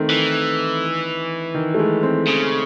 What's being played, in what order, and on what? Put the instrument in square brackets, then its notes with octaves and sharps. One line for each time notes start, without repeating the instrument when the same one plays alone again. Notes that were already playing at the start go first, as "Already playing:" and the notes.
Already playing: [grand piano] D#3 A3 C4
[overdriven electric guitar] E3
[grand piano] D#3
A3
G#3
C4
[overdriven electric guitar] C#3